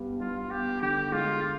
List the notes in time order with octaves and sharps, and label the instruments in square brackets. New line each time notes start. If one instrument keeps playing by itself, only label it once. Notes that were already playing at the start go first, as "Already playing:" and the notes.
Already playing: [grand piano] G2 G3 B3
[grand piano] G3 [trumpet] F4
[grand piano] B3 [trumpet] G4
[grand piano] D3 [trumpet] G4
[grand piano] G#3 [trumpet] F4